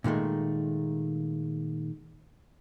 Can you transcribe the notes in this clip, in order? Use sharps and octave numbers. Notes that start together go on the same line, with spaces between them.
A#2 D#3 G#3 A3